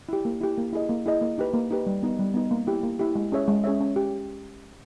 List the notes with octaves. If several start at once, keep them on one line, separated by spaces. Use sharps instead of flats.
E4 G4
A#3
E4 G4
A#3
E4 G#4 D#5
A#3
E4 G#4 D#5
A#3
D#4 G4 B4
A#3
D#4 G4 B4
G3
B3 D#4
G3
B3 D#4
A#3
E4 G4
A#3
E4 G4
G#3
C#4 G#4 C#5 E5
G#3
C#4 G#4 C#5 E5
C#4
G4